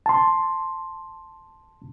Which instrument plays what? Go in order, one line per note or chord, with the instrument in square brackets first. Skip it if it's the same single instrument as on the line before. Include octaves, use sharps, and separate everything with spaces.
[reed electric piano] A5 C6